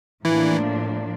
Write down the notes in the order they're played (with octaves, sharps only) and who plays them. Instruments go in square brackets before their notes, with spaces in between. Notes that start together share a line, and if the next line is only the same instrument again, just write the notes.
[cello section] A2 F3 A#3 D4 [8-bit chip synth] E3 E4